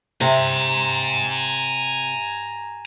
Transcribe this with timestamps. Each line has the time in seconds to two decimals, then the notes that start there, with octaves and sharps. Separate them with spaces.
0.21 C3 G#5 A#5